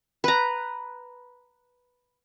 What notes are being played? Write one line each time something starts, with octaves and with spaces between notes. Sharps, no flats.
B4 A#5